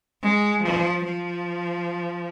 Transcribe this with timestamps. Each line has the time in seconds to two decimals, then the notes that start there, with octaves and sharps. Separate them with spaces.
0.22 G#3
0.63 F3
1.04 F3